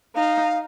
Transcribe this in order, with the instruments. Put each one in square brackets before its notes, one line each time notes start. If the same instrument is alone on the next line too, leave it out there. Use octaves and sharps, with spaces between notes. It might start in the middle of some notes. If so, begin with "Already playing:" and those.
[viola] D#4 [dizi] F5